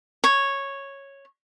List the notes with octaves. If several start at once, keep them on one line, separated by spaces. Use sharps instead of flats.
C#5